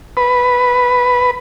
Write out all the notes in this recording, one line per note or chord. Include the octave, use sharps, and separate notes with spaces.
B4